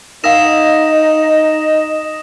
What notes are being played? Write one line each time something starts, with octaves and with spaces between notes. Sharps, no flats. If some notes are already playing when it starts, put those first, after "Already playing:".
D#4 A#4 D#5 F5 F#5 D#6 A#6 E7